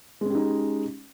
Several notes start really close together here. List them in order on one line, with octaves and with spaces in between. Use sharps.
G#3 C#4 G4 D#4